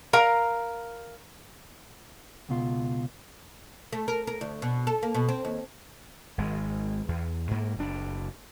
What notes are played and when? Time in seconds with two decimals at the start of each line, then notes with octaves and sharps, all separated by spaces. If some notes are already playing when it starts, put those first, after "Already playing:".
0.13 A#4 F5 A#5
2.49 C#2 B2 F4
3.93 A3
4.08 A#4
4.27 A#4
4.41 D2
4.62 B2
4.87 A4
5.03 A#3
5.14 B2
5.29 C4
5.45 D#2
6.38 G#1 G#3
7.09 E2
7.51 G#2 A#3
7.79 F#1 D4